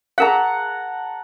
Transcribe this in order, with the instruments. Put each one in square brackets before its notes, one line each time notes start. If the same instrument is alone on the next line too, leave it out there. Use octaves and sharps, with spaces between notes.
[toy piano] G#4 A#4 F5 [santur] F#5 A5 A#5